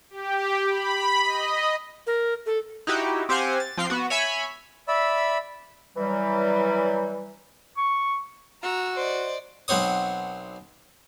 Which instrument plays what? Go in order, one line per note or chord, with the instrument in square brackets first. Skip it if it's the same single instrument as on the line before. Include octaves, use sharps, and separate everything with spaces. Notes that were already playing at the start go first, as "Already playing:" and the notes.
[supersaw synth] G4
B5
D#5
[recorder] A#4
A4
[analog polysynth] D#4 E4 F#4 G4
C4 G4 C5 F5 F#5 G#5
A6
F3 C4 F5 G5 C7
B3 F#4
C#5 E5 G#5 B5
[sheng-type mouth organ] D5 E5 B5 E6
[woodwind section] E3 F#3 G3
[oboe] C#6
[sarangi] F#4 [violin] A#5 E6
[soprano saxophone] C5 [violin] D5 D#5
[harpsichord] B1 F#3 C4 C#5 D#6